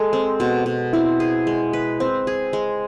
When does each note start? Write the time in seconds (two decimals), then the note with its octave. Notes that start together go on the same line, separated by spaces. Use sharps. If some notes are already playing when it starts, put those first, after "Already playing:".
Already playing: G#3 A4
0.13 C4
0.40 B2
0.66 B2
0.93 C4 E4
1.20 G#4
1.47 G#3
1.73 B4
2.00 C4 C5
2.27 G#4
2.53 G#3